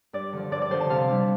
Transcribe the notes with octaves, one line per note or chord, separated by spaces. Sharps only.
G2 D5
D3 F3
G2 D5
D5
D3 F3 C5
A5
C3 F5
G3 D4